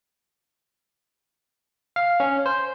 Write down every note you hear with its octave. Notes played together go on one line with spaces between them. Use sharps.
F5
C#4
C5